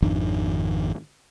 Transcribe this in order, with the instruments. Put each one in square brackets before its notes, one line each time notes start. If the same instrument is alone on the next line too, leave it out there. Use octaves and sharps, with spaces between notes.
[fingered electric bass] G#1 F2 D#3 D4